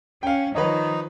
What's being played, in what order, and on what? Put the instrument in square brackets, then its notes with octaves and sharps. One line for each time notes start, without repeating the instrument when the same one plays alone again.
[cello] C#4 [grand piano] F5 G5
[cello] D#3 F3 [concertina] D#4 [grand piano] B4 C#5 D#5